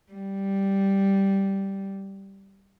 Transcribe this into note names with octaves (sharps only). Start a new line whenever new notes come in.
G3